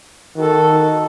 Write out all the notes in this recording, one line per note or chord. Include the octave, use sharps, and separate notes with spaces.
D#3 F#4 A4